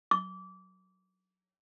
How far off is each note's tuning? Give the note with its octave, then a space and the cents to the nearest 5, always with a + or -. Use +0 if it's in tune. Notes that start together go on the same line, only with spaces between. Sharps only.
D6 -25